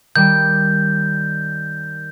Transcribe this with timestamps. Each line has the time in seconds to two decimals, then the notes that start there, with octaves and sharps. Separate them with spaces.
0.16 D#3 G3 G5 G6